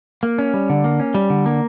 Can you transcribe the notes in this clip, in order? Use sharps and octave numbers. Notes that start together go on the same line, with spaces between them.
A#3
C#4
G3
D3
A#3
C#4
G3
D3
A#3